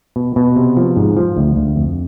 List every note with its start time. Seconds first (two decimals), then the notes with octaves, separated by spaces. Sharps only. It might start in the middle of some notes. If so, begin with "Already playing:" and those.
0.16 B2
0.36 B2
0.56 C3
0.77 F3
0.96 G#2
1.17 F3
1.37 D2
1.56 D2
1.76 F2